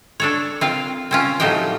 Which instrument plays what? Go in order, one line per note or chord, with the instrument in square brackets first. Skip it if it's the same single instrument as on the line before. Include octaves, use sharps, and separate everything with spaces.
[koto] D4 A4 C#5
C4 F4 F5
C4 C#4 F4
A2 F3 F#3 D#4 G4 G5